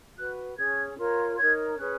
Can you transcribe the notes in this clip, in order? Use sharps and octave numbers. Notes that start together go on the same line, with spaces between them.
F#4 B4 F#6
C#4 G#4 C#5 G#6
F4 A#4 C#5
D#4 A#4 C#5 G#6
C#4 G#4 B4 F#6